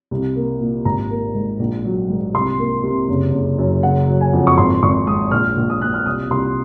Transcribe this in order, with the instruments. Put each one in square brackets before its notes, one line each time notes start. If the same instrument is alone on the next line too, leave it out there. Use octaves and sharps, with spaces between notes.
[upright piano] C2
A#3
A#2
G#1 A#5
A#3
G#2
A#1
F#3
G#2
C2 C6
A#3
C3
F#1
F#1
F#2
F#1 F#5
F#3
G#5
F2
C#6
G#1 C6
G#1 C#6
G#2 D#6
A#1 F6
A#1
D#6
A#2 F#6
F6
C2 D#6
C2 C6